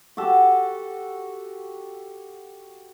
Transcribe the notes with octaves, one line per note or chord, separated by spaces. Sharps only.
F#4 G4 A4